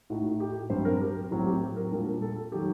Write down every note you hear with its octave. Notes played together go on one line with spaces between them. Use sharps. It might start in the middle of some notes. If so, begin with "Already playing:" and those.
A2 A3 D#4 F#4
G4
G2 F#3 C4 C5
A#4
G4
A2 F#3 C4
G4
A#4
A#2 G3 A#3 D4 A#4
A4
D#3 F#3 G4